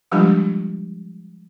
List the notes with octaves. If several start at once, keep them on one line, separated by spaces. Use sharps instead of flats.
F3 G3 G#3 D4 F4 G4